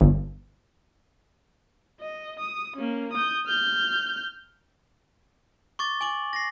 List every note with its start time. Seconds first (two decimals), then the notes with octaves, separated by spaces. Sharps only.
0.01 G1
2.00 D#5
2.40 D#6
2.77 A#3 C#4
3.13 D#6 G6
3.47 F6 G6
5.79 C#6 D6 A6
6.01 G#5 D6 F#7
6.33 A#6 C7